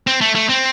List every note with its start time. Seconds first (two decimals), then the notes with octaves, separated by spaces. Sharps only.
0.07 C4
0.21 A3
0.35 A3
0.49 C4